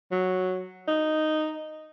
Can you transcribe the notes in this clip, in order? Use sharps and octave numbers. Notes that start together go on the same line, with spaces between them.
F#3
D#4